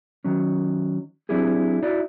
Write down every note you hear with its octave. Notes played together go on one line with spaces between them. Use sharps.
D#3 F#3 C#4
F#3 C4 D4 E4 G4 G#4
D#4 E4 F#4 D5